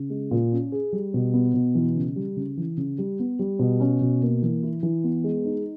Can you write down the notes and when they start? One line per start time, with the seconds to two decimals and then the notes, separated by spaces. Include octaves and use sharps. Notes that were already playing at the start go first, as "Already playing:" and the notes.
Already playing: C#3
0.10 G#3
0.31 A#2
0.52 C#4
0.72 G#4
0.93 G3
1.14 B2
1.34 B3
1.54 B2
1.75 E3
1.96 C#3
2.16 G3
2.37 C#3
2.57 E3
2.77 C#3
2.98 G3
3.19 B3
3.39 G3
3.59 B2
3.80 C#4
4.01 B2
4.22 A#3
4.42 E3
4.63 E4
4.83 E3
5.04 B3
5.24 G#3
5.45 D#4